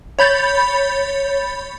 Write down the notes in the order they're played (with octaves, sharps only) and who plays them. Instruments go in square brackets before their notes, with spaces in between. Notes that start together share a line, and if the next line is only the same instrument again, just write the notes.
[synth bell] C#5 B5 G6 A6